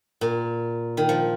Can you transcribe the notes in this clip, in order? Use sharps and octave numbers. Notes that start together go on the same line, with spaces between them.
A#2
D#3
F3